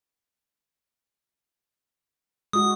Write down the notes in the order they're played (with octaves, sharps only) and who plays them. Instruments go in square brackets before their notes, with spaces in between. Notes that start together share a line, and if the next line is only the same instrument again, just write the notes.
[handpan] G#3 F#4 [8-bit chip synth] D#6